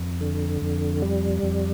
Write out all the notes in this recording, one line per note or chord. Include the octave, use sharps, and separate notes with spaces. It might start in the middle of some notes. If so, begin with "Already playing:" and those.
Already playing: F2
D3
F2
G3
F2